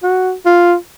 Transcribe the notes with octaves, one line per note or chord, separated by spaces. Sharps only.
F#4
F4